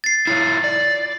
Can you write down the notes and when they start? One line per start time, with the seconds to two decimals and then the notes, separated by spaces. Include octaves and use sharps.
0.04 A6 C7
0.27 E4 F4 C#5 A6
0.64 D5